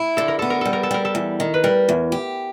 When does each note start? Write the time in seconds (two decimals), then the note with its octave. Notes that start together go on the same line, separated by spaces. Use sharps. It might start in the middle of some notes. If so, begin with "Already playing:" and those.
Already playing: E4
0.17 D3 A4
0.28 A#4
0.39 B3 A4
0.50 A#4
0.61 G3 A4
0.73 A#4
0.83 A4
0.91 G3 A#4
1.05 A4
1.15 E2
1.40 D#3
1.54 B4
1.64 G3 A#4
1.89 E2
2.12 G4